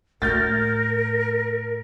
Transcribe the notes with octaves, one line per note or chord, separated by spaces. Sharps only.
A2 A#4 F6 G6 A6